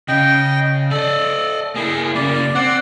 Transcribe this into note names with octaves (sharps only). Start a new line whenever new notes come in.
C#3 D#5 G5
A4 D5 D#5
A#3 E4 G#4
C#3 A#3 D5
C4 D5 F#5